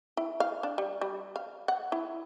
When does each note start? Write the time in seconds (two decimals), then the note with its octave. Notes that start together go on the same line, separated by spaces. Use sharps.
0.17 E4
0.40 F5
0.63 D4
0.78 G3
1.01 G3
1.36 F5
1.68 F#5
1.92 E4